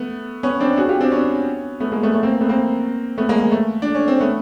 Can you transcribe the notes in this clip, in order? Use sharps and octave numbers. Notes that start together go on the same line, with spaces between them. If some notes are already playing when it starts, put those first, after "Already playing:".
Already playing: A3 B3
B3 C#4
C4 D4
F#4 G#4
F4 G4
C4 D4
B3 C#4
A3 B3
G#3 A#3
A3 B3
A3
A#3 C4
A3 B3
A#3 C4
A3 B3
G#3 A#3
G#3
A3
D4
C#4
C4
A3 B3